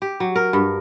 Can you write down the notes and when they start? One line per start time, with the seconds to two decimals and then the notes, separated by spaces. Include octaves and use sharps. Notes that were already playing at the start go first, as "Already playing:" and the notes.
0.02 G4
0.20 F#3
0.36 A#4
0.53 G2